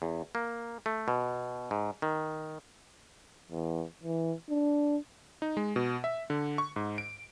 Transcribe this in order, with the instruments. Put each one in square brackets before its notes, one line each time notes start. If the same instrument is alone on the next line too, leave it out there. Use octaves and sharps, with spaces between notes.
[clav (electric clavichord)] E2
A#3
A3
B2
G#2
D#3
[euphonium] E2
E3
D4
[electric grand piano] D#4
G#3
B2
E5
D3
C#6
G#2
D7